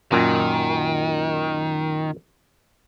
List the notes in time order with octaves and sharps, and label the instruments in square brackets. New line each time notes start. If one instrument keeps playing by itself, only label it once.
[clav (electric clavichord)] F#2 A#2 [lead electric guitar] D#3